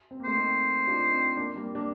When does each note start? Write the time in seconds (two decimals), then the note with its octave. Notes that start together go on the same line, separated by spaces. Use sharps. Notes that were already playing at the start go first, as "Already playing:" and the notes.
0.11 C4
0.20 A#3
0.25 A3 C4 C5
0.36 C4 D#4
0.87 D4 F4
1.12 C4 D#4
1.37 A#3 D4
1.56 G3 A#3
1.75 A#3 D4